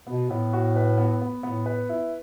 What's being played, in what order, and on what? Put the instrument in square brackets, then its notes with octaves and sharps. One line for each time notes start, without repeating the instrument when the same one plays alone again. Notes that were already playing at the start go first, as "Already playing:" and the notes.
[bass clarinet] B2 [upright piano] B3
[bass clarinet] A2 [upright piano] B3
[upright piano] F#4
B4
B3
B3
[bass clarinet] A2 [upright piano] B3
[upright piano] B4
E4